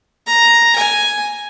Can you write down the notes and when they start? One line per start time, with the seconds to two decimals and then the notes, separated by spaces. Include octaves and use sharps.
0.27 A#5
0.76 G#5